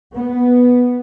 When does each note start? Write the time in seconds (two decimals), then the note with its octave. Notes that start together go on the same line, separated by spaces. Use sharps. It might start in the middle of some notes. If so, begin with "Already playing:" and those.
0.14 B3